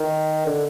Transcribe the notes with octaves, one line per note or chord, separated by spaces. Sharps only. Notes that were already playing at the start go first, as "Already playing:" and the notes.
Already playing: D#3
D3